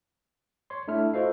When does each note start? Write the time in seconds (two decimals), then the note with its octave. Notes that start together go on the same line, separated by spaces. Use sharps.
0.70 C#5 C6
0.88 A3 D4 E4 F6
1.14 F4 F#4 A4 C5 D#5 F5